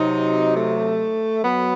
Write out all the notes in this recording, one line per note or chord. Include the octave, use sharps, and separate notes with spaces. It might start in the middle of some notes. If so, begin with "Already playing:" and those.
Already playing: C3 F#3 D#4
A3
F#3 B3